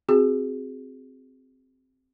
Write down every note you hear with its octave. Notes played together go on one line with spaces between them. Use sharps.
C4 F#4 G#4